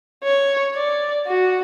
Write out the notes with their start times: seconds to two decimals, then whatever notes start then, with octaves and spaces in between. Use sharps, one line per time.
0.24 C#5
0.75 D5
1.27 F#4